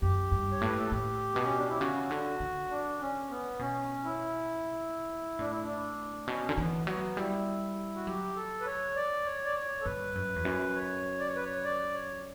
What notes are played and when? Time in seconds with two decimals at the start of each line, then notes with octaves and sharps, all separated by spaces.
0.02 F#2 G4
0.32 G2
0.52 C#5
0.61 A2 B4
0.79 A4
0.92 A2 G4
1.32 B2 B3
1.44 C#4
1.57 D4
1.69 E4
1.80 C#3 F#4
2.11 D3
2.40 D3
2.70 D4
3.00 C#4
3.30 B3
3.59 B2 C#4
4.04 E4
5.38 A2 D4
5.51 E4
5.63 D4
6.28 B2 C#4
6.49 D3
6.57 E3 B3
6.83 A3
6.87 F#3 B3
7.17 G3 E4
7.96 F#4
8.06 F#3 G4
8.36 A4
8.61 B4
8.66 C#5
8.95 D5
9.26 C#5
9.45 D5
9.55 C#5
9.81 A4
9.85 G2 B4
10.15 F#2
10.36 E2
10.45 F#2
10.74 C#5
11.19 D5
11.28 C#5
11.36 B4
11.45 C#5
11.64 D5
11.94 C#5